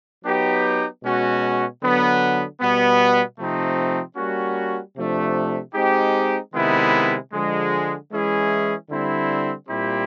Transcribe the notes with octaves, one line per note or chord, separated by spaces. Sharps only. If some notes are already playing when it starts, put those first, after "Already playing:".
F#3 B3 D#4 G4
B2 G#3 C#4 F#4
D3 F#3 B3
B2 G3 B3
C3 F3 A3 C4 D#4
G3 A#3 C#4 F#4
C3 F3 A3 D4
G#3 C4 D#4 G4
C3 D#3 G#3 B3 E4
D3 F3 G#3
E3 G#3 C#4 E4 G#4
D3 G3 C4 E4
A#2 G3 C4 E4 G4